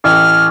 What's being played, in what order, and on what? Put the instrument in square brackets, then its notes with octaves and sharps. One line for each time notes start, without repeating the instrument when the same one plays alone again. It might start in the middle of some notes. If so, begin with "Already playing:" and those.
[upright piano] A1 [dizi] F6